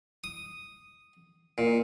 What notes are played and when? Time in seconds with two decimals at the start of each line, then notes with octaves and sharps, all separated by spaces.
0.24 D#6
1.58 A#2